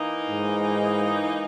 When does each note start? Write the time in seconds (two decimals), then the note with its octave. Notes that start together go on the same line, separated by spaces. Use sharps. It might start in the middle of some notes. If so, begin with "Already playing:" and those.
Already playing: E3 A#3 D#4
0.30 G#2